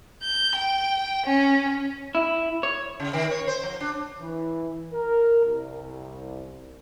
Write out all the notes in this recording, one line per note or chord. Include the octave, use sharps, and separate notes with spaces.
G6
G5
C#4
E4
C#5
C#3
D#3
C#5
C5
F3
D4
E3
A#4
C2